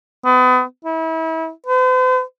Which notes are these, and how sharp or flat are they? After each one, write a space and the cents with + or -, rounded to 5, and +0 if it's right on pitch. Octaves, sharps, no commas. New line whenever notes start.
B3 +35
E4 -35
C5 -45